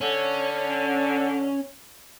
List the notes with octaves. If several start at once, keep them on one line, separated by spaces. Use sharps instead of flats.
D3 C#4